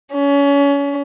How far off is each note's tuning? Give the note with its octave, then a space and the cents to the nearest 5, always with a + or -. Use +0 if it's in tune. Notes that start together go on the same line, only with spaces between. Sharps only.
C#4 +30